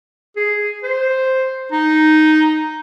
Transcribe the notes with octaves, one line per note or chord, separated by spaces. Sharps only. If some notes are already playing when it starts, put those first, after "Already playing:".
G#4
C5
D#4